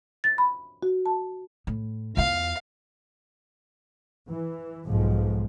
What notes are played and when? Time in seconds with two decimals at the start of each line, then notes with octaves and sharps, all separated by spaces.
0.24 A6
0.38 B5
0.83 F#4
1.06 A5
1.67 A2
2.17 E2 F4 F5
4.28 E3
4.86 B1 G#2 F3 G#3